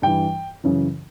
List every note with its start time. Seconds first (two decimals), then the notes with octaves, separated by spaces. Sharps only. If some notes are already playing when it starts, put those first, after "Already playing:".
0.02 G2 E3 G5
0.64 F#2 C#3 E3